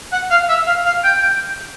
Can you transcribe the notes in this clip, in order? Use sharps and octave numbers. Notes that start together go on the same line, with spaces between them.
F#5
F5
E5
F5
F5
G5
G5